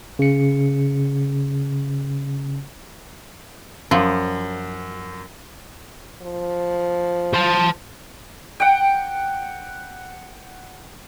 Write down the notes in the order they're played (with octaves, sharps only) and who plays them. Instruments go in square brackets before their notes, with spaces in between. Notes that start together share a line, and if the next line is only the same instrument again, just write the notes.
[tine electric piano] C#3 C#7
[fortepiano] F#2 [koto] F3
[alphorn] F3
[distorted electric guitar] C5 A5
[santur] F#5 G5